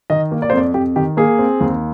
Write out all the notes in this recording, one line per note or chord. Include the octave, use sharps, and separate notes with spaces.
D#3 D#5
A#3
D5
C5
F2 D5
F2 G4
D#3 G4
A#3 G#4
C4
D#2